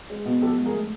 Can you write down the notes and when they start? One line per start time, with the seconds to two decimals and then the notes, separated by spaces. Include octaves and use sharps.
0.10 G#3
0.26 B2
0.42 F3 G4 A4
0.58 G#2
0.66 G#4 A#4
0.74 A3